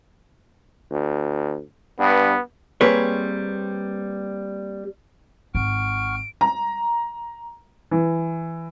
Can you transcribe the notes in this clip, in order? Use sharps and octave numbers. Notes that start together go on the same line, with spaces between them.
D2
G2 B3
G3 A#3 C4 G#4 B4 C#5
G#1 F#5 C#6 F6 D7
A#5
E3